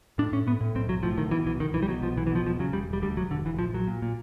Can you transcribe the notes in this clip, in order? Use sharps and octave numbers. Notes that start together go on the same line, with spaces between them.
A2 D4
A2 C#4
A2 B3
A2
B1 C4
B1 F#3
A2 F3
B1 D#3
B2 E3
B1 E3
B1 D#3
B1 E3
G3
B2 F#3
B1 F3
B1 E3
E3
B2 F3
E1 F3
C#3 F#3
E1 G3
E1 G3
D2 G3
E1 F#3
E1 D3
E1 E3
A#1 F3
A#1 F#3
A#2
A#2